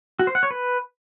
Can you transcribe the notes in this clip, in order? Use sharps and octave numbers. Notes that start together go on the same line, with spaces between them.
F#4
C5
F#5
C#5
B4